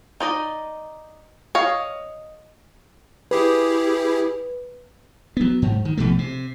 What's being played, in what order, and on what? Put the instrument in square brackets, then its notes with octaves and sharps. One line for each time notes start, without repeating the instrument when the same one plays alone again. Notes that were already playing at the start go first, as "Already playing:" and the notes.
[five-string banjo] D#4 D5 D#5
C#5 D#5 F5
[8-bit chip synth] E4 G4 G#4 [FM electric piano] B4
[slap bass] F#3 B3
G#2
D#3
A#1 B2 F3 A3
C3